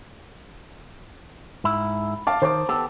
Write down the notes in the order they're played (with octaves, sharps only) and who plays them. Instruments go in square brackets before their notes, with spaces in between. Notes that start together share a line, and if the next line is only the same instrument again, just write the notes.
[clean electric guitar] G#2 E4
[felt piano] F5 A5 D6
[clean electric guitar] D#3 [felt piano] C5 A5 D6
[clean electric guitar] B3 G4 A4 [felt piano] A5